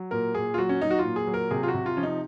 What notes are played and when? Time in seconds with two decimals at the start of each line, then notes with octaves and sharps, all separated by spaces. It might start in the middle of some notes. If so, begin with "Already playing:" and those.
Already playing: F#3
0.11 A#2 A#4
0.35 A#2 G#4
0.54 F4
0.58 F#3 F#4
0.69 C#4
0.81 F#3 D#4
0.91 F#4
0.99 F4
1.05 A#2
1.16 G#4
1.27 F#3
1.34 A#4
1.51 C3 G#4
1.63 F4
1.68 F#4
1.74 C3
1.86 F4
1.97 F3 C#4
2.03 D#4